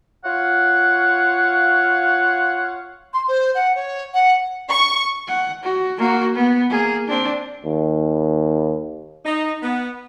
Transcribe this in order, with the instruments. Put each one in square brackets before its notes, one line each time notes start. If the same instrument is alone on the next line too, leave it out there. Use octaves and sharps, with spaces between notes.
[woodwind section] F4 C#5 F5 F#5
[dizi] C6
C5
F#5
C#5
F#5
[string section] C#6
[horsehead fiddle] F#5
F#4
A#3 F#4
B3
A#3 G#4
C4 D4
[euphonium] D#2
[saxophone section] D#4
B3